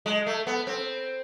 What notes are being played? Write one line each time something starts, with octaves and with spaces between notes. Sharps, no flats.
G#3
A3
B3
C4